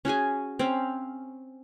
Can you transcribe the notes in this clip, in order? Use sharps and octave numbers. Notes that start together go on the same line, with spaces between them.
C#4 F#4 G#4 G#5
C4 C#4 F5